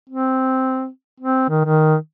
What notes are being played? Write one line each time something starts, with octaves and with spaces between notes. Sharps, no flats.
C4
C4
D#3
D#3